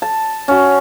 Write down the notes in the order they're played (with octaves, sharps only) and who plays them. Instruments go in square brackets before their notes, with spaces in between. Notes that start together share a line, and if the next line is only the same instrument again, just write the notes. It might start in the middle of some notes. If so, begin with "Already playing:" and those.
[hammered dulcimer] A5
C#4 F#4